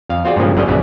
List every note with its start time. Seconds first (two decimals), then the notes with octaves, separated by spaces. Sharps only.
0.09 F2 F5
0.25 C4 F4 F#4 G#4 D5
0.36 G2 A#2 C#3 F3 G#3
0.55 G1 F#2 D3 G3 C#4 D#5
0.66 A#1 F#2 C#3 B3 E4 D5